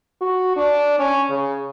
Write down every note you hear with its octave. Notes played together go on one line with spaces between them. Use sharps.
F#4
D4
C#4
C#3